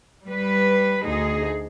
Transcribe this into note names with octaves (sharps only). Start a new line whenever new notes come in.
G3 B4
D2 D#4 G#4